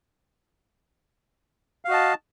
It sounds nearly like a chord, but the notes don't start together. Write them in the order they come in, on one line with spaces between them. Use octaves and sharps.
F5 F#4 D#5 A5